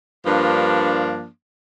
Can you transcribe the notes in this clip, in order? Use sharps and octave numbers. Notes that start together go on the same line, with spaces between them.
G2 F3 A#3 D4